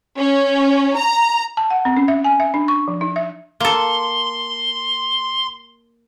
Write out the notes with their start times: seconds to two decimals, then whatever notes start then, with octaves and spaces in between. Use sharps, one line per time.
0.16 C#4
0.96 A#5
1.57 A5
1.70 F#5
1.85 C4
1.97 C#4
2.08 E5
2.24 G#5
2.40 E5
2.54 D4
2.68 C#6
2.88 F3
3.01 D#4
3.16 E5
3.60 A#3 A4 C6